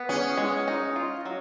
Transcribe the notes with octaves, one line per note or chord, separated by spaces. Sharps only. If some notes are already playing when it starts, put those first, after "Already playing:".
Already playing: B3
C#4 G#4
G#3
D#4
F4
F#3